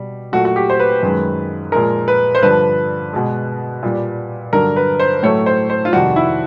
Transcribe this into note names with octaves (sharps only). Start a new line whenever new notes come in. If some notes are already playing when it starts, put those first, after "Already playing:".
Already playing: B2 G3
A#2 F#3 A3 F#4
F#4
G4
C5
B4
F#2 D#3 G#3
A#2 F3 G#3 A#4
B4
C5
G2 D3 F3 B4
B2 G#3
A#2 G3
G2 D3 F#3 A#4
B4
C5
A2 F#3 A3 C#5
C5
C5
F4
F2 C3 D#3 G3 F#4
E4